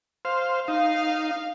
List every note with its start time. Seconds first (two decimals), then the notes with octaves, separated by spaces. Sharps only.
0.25 C5 F5
0.68 D#4 F5